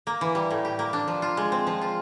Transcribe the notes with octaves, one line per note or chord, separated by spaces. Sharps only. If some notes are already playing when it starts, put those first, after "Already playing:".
A#3
E3
G3
A2
G4
A#3
D4
F3
F4
G#3
C4
F3
F4